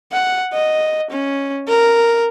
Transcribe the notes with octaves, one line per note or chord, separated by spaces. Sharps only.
F#5
D#5
C#4
A#4